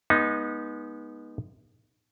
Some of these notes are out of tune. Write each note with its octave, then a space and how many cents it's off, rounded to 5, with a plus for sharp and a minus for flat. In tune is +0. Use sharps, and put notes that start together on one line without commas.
G#3 -5 B3 -30 D#4 +0